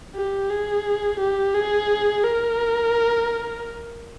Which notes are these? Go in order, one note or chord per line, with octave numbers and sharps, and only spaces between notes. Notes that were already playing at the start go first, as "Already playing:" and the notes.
G4
G#4
G4
G#4
A#4